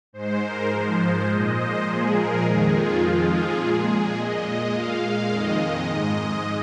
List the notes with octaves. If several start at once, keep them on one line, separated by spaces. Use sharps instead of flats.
G#2 G#3 C5
A#4
G#2 F3 G#3 C5
A#2 G#3 D#5
C5
A#2 F3 G#3 G#4
A#4
F2 D#3 G#3 G#4
F4
F2 F3 G#3
G#4
A#2 G#3
A#2 G#3 D#5
A#2 G#3 F5
F2 D#3 G#3 D#5
G#2 G#3